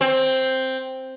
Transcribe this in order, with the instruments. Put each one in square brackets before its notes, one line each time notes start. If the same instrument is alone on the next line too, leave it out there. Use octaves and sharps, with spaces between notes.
[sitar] C4